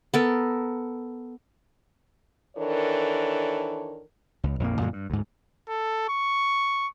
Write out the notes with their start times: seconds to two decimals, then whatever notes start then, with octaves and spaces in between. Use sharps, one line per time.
0.14 B3 A4 A#4
2.57 D#3 E3 D4 A4 A#4 C#5
4.43 C#2
4.60 A#1 F2 A#2 A#3
4.80 F#2 A#2 D3 G#3
4.93 G2
5.10 D2 G#2
5.69 A4
6.09 C#6